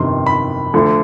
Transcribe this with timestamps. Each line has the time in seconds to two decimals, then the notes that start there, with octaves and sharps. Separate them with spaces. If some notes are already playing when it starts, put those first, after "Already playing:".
Already playing: G1 F2 C3 D#3 C6
0.26 B5
0.73 D2 D3 F3